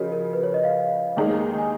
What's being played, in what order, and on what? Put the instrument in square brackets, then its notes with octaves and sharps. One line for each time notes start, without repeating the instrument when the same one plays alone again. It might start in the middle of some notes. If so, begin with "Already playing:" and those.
Already playing: [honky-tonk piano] C#3 F3 [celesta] F#4 G#4 A#4 C#5 D#5
[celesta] A#4
B4
C#5
D#5
F5
[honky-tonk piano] D#2 D#3 G#3 D#4 G#4
[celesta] G#5